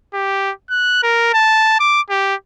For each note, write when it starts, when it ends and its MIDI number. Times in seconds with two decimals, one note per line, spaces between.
0.14 0.51 67
0.70 1.02 90
1.03 1.31 70
1.33 1.79 81
1.80 2.01 86
2.10 2.35 67